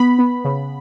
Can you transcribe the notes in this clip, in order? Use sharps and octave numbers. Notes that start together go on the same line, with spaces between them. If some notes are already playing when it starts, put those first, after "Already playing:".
Already playing: B3 B5
B3
C#3